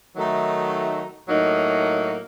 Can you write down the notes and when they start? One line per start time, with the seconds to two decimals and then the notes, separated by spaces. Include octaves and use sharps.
0.16 D#3 F#3 A3 D#4 F#4
1.27 A2 F#3 A#3 D#4